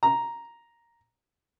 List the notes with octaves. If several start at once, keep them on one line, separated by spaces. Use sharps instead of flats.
A#5